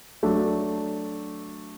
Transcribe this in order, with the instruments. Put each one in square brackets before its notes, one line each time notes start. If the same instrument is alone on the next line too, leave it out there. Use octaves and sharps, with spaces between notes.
[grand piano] F#3 A3 D4